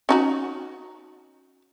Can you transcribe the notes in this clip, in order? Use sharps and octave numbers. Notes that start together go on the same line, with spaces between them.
C#4 D#4 F#4